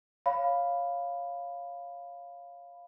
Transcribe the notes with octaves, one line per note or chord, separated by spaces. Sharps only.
C#5 F5 B5